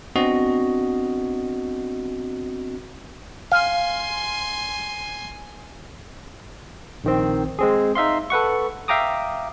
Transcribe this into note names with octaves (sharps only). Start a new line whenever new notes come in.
B3 C4 D4 F#4 D#5
F5 G#5 C6
A#1 D#3 C4
G#3 C4 G#4
D#4 E5 F5 C6
A4 B4 F#5 C#6
E5 F5 G5 A#5 D6 D#6